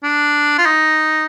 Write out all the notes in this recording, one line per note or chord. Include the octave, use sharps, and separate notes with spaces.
D4
F4
D#4